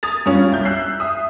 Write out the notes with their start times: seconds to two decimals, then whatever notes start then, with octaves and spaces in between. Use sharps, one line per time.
0.03 D#6 G#6 A6 F7
0.26 G2 C#4 F4
0.52 C2 G6
0.65 E6 F#6 C7
1.00 E5 D#6